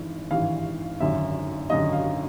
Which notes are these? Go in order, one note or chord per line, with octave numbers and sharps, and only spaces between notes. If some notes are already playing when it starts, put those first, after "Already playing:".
Already playing: G#1 G2 E3
G#1 G2 E3 F5
G#1 F#2 D3 E5
G#1 F#2 D3 D#5
F5